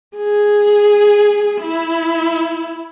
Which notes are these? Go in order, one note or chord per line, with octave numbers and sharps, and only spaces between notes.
G#4
E4